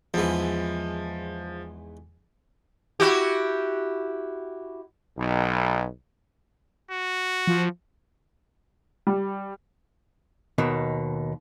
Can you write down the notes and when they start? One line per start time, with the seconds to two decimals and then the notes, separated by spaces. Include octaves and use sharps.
0.14 E2 G#2 E3 F3
3.00 E4 F#4 G4
5.18 B1
6.91 F#4
7.47 F3
9.07 G3
10.58 D#2 B2 D#3